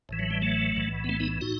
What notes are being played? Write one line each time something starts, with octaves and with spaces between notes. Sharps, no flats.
A1 A2 E3
F#3
G3
F#3 A3
B1 A2 E3
B3
A3 C4
B3 D#4
A2 D#4 F#4